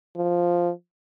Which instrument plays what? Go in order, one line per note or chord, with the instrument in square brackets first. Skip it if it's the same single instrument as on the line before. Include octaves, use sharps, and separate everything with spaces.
[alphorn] F3